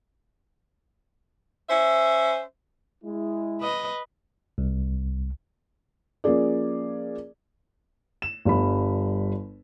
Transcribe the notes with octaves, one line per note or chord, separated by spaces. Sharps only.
C#4 C5 E5
G#3 E4
B4 D#5
C2
F3 A#3 C#4 G#4 D5
E7
G1 G3 B5